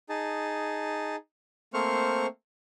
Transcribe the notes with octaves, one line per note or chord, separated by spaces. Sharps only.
D#4 G#4 A5
A3 A#3 C4 C5 C#6 F6